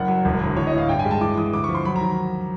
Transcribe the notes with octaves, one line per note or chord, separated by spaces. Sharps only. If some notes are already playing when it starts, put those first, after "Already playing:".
Already playing: F#1 F#5
F#3
E1
D2
E3 C#5
D#5
A2 F5
G2 G5
G#5
G#3
A5
E3 D6
E3 D#6
D2 D6
F3 C#6
C6
F#3 B5
A#5
D#3